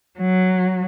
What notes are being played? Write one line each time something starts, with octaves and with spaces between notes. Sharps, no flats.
F#3